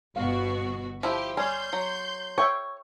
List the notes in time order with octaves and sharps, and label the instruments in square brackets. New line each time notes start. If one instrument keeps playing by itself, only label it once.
[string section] G1 B2 F#4 [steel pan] F5
[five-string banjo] F3 E4 [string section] G4
[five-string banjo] G3 C#4 [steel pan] G#5 [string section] C6 G6
[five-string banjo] F#3
[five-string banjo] C#5 [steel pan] E5 G5 C#6